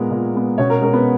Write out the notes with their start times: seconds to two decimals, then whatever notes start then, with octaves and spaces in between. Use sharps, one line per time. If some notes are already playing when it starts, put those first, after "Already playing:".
Already playing: A#2 G#3 B3 A#4
0.11 A#2
0.35 G#3 B3
0.58 B2 C#4 C#5
0.70 A#4
0.81 G#3 C#4 A#4
0.93 B3 B4